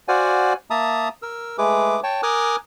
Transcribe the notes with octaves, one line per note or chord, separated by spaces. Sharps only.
F#4 C5 D5 F5 F#5 G#5
A#3 E5 A5 A#5 D#6
A#4 E6
G#3 A3 G#4 B4 D6
C#5 G5 A5
A#4 G#5 D6 D#6 F6 F#6